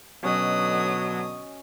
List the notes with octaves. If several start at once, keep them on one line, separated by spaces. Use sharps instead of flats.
B2 D3 F#3 C#4 D#5 D#6